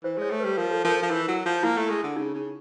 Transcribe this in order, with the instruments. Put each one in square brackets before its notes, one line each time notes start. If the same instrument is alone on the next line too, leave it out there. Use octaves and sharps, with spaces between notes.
[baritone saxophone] E3 [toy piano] C5
[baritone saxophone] G#3 [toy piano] C#5
[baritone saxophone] A3
[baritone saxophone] G3 [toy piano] B4
[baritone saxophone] F3 [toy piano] A#4
[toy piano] A4
[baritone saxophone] F3 [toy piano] A#4
[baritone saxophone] F3
E3
F#3
F3
[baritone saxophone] A#3 [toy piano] E4
[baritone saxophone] A3
G#3
D3
[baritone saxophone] C#3 [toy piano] D#4
[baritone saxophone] C#3